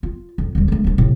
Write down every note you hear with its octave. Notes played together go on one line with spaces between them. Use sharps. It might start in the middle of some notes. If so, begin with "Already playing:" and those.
F4
F2
D#2 G3
A3 D4
F3 A3
A2 C3